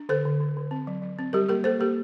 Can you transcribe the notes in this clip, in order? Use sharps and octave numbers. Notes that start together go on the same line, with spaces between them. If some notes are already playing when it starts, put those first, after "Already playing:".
Already playing: D4
D3 A4 C5
D3
D3
D3
C4
F#3
F#3
C4
G3 G4 A#4
A#3 G4 A#4
A#3 A4 C5
A#3 G4 A#4